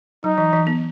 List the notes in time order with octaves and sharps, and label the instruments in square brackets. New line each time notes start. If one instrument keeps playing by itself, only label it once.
[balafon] F#3 [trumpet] D#4
[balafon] E3
E3
B3